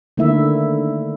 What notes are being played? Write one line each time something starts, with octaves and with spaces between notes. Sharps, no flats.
D3 D#3 A3 A#3 E4 E5